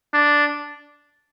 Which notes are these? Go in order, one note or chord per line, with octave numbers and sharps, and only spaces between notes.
D4